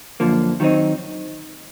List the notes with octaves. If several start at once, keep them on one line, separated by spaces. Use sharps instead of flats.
F#2 D3 F3 A#3
D#3 F#3 A3 C4 D#4